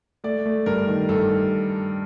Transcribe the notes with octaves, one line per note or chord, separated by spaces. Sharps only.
A3 D5
A3
G2 A#4
D#3
G2 A4